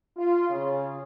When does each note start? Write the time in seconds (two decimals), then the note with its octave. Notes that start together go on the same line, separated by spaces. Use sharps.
0.17 F4
0.50 C#3